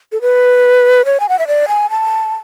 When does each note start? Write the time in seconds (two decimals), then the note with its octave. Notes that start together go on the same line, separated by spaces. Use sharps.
0.12 A4
0.22 B4
1.05 C#5
1.20 G#5
1.29 F#5
1.39 E5
1.48 D5
1.68 G#5
1.90 A5